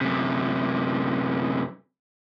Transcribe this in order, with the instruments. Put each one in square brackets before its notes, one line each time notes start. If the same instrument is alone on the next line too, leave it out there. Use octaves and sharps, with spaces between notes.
[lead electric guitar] F#2 C3